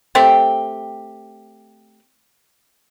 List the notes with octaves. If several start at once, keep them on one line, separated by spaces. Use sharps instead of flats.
A3 C4 G4